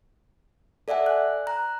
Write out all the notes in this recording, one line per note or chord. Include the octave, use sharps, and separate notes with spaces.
A4 D5 E5 F#5 G#5
F#6
A#5 F#6